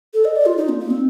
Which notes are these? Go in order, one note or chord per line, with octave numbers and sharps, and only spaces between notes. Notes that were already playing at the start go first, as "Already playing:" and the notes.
A4
D#5
D5
F4
D#4
A#3
A#3
C4